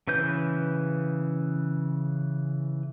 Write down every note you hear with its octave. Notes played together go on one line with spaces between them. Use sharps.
C#3 E3 B4 G6